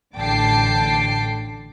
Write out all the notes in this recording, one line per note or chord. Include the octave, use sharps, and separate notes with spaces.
A1 D3 G5 A5 D6 C7